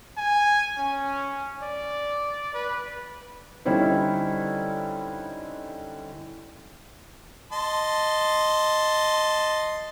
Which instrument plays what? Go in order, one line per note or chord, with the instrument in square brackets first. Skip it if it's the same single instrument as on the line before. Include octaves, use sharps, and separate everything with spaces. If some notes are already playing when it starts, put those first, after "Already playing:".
[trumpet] G#5
C#4
D5
B4
[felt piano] D3 G3 C#4 D#4 E4 C5
[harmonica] D#5 A5 C6